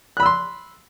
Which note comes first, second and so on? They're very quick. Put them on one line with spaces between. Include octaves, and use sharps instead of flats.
F#6 B5 E6 C6